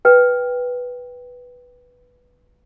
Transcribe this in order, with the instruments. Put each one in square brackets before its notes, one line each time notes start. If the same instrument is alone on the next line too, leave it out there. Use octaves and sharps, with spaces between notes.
[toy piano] B4 G5